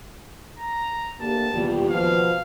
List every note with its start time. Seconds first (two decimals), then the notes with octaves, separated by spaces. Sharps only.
0.58 A#5
1.20 D2 A#3 G4 A5
1.54 E1 D#2 G3 B3 F4 G4
1.90 B2 F3 F5